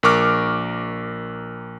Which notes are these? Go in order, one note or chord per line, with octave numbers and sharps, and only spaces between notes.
A#1 A#4 C#6 D6 F6